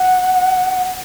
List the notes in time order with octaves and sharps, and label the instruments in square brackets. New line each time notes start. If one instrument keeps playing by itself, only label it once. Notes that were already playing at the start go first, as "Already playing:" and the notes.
Already playing: [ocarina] F#5